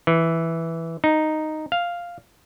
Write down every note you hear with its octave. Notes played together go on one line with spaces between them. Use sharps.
E3
D#4
F5